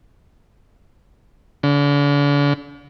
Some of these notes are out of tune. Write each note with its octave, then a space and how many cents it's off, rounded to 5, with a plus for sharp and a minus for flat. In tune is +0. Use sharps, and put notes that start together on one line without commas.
D3 -40